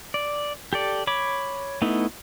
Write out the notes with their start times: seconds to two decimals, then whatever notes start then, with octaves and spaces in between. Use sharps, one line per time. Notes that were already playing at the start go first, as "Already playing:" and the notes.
0.14 D5
0.73 G4 A4 D5
1.07 C#5 B5 D6
1.82 A3 B3 D#4 E4